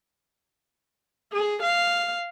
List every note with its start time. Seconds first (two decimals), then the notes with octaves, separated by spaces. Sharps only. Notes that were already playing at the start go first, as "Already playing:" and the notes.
1.33 G#4
1.62 F5